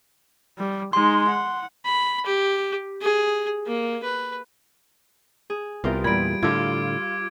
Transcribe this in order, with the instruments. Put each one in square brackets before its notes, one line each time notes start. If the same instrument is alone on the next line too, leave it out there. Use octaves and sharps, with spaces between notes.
[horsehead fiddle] G3
[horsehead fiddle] G#3 D#4 [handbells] C6
[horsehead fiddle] F#5
[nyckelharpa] B5
G4
G#4
A#3
B4
[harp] G#4
[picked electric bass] C2 [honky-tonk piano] B3 E4 [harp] F4 G4 A#4
[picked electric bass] E2 A#2 [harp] G3 B5 [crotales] G#6 D7
[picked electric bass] A2 D3 [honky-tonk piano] F4 [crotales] D6 E6 G#6